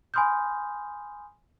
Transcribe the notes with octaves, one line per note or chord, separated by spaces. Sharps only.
G#5 B5 C6 D#6 F6 G6